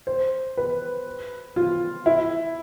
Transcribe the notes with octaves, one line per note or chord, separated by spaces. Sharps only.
C5
B4
F4
E4